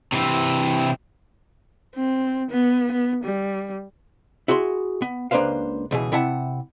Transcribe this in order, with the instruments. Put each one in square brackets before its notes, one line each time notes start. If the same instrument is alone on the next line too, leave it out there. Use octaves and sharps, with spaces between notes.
[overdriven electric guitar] C3 E3
[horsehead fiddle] C4
B3
B3
G3
[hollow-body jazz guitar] E4 F#4 G#4 B5 C6
B3
C#2 A#3 D4 B4 C5 F5
C#2 B2 E3 G#4
C3 E4 E5 F#5 A5